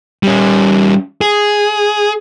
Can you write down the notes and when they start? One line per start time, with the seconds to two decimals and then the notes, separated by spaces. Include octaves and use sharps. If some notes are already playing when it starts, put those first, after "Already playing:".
0.23 G3 C#4
1.21 G#4